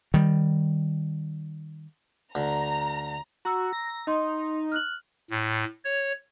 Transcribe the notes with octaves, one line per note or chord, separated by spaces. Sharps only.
D#3 G3
D2 A#5
F#4 A#5 E6
A#6
D#4 D#5 C6
F6 F#6 F#7
A2
C#5